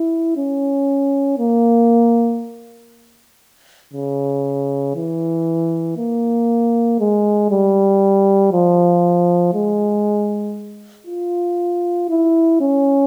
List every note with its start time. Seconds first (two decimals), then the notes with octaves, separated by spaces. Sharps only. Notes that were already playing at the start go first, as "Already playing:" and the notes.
Already playing: E4
0.37 C#4
1.39 A#3
3.94 C#3
4.96 E3
5.98 A#3
7.00 G#3
7.51 G3
8.52 F3
9.54 G#3
11.07 F4
12.09 E4
12.61 C#4